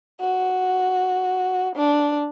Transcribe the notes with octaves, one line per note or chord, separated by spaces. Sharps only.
F#4
D4